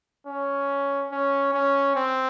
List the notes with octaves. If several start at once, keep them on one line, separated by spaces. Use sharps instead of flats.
C#4
C#4
C#4
C4